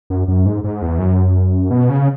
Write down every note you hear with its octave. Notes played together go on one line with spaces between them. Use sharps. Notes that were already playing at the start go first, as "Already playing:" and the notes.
F#2
F#2
G#2
G#2
E2
F#2
B2
C#3